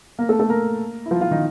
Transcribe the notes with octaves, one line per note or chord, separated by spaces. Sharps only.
A#3 A#4
A3 A4
A3 A4
A#3 A#4
E4
F3 F4
F3 F4
D#3 D#4